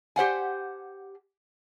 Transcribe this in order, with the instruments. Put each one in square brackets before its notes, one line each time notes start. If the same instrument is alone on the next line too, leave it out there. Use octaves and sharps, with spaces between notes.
[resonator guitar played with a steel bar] G4 C5 F#5 G#5